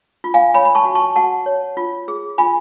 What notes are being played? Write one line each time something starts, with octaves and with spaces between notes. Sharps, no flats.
F4
F5 G#5
C#5 G#5 B5
B5
A5 C#6
F#4
A5 C#6
F#4 F#5 A5
C#5
F4
G#4
F4 G#5 B5